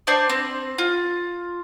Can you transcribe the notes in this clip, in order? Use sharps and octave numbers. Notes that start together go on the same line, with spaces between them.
D4 C5 D5
C4
F4